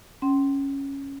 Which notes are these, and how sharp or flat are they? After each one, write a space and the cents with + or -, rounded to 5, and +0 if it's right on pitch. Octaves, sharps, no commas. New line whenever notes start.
C#4 -5 G5 -40 C6 +0